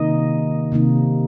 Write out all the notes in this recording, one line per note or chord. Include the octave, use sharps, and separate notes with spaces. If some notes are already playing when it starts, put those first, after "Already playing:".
Already playing: C3 D#3 A#3 D#4 D#5
C3 D#3 A#3 D#4